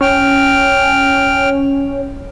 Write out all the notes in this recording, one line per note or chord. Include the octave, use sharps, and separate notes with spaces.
C#4 G5 F6